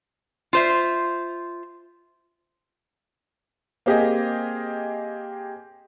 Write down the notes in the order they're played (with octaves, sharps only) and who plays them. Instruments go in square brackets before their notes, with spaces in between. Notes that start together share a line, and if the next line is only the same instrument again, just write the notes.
[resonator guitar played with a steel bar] F4 C5 E5
[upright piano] A#3 C4 G4 G#4 D#5